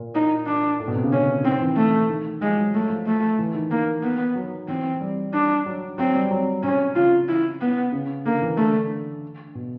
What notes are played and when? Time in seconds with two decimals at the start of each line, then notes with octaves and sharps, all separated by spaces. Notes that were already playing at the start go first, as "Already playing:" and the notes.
Already playing: A#2
0.15 D#4
0.46 D4
0.80 A2
0.88 B2
0.96 C3
1.04 C#3
1.12 D3 C#4
1.44 D#3 C4
1.61 E3
1.76 E3 A3
2.09 D#3
2.41 F3 G#3
2.57 F#3
2.74 F#3 A3
2.90 F3
3.07 A3
3.39 E3
3.55 D#3
3.71 D#3 A#3
4.03 B3
4.36 F#3
4.68 E3 C4
5.01 G3
5.33 D4
5.66 F#3
5.98 F#3 C4
6.15 G3
6.31 F#3
6.63 C3 C#4
6.95 C#3 F4
7.29 E4
7.61 B3
7.92 C#3
8.25 D3 A#3
8.42 E3
8.57 D3 A3
9.55 B2